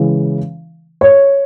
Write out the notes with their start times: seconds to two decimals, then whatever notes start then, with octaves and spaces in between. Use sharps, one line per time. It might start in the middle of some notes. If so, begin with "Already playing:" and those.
Already playing: C#3 E3 G#3
1.01 C#5